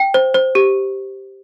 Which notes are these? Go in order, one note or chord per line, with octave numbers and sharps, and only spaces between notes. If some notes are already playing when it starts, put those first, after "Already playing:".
Already playing: G5
C5
C5
G4